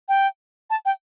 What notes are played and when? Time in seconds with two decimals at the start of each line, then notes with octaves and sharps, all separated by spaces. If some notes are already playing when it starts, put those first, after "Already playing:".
0.09 G5
0.70 A5
0.85 G5